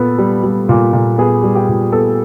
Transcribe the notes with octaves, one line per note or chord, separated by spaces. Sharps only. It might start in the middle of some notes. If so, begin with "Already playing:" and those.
Already playing: A#2 B3 A4
G3
G3
A#2
A#2
B3 G#4
G3
G4
A#2
B3 A4